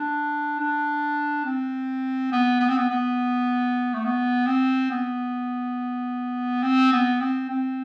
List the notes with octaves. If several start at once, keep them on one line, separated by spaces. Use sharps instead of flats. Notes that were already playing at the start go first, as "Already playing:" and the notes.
Already playing: D4
D4
C4
B3
B3
C4
B3
B3
A3
B3
C4
B3
C4
B3
C4
C4